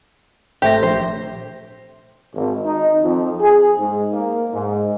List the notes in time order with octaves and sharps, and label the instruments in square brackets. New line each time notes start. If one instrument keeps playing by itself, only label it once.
[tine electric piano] G#1 A3 A#6 [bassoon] C3 [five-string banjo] G4
[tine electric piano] A#1 [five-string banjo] C5
[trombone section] G#1
D#4
F2
G#4
G#2
A#3
G#2